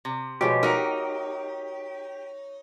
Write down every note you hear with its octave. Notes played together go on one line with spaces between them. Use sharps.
C3
B2 F3 G#3 G4 C#5 C#6
D#4 F#4 A#4